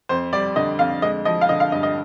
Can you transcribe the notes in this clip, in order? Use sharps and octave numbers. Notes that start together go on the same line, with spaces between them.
F2 C5
G3 D5
D3 D#5
F2 F5
G#3 D#5
F3 D#5
F5
D3 D#5
F5
G2 D#5
D#5